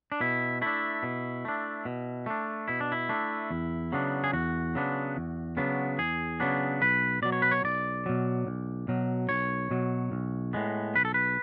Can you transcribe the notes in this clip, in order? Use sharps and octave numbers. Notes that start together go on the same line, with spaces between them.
D4
B2 E4
A3 D4 E4
B2
A3 D4
B2
A3 D4
B2 E4
D4
E4
A3 D4
E2
C#3 F#3 B3 D4
G#4
E2 F#4
C#3 F#3 B3 D4
E2
C#3 F#3 B3 D4
E2 G#4
C#3 F#3 B3 D4
B1 B4
B2 F#3 D5
C#5
B4
C#5
B1 D5
B2 F#3
B1
B2 F#3
B1 C#5
B2 F#3
B1
A2 G#3 B3
B1 B4
A4
B4